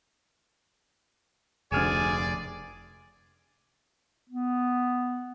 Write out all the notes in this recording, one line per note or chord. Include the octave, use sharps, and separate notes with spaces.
F1 D2 G#4 D5 G#5 F6 E7
B3